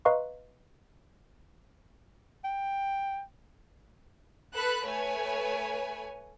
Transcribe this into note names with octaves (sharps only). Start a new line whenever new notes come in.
B4 D#5 F5 A#5 C6 C#6
G5
A4 B4 B5 F#6
A3 B4 C#5 G#5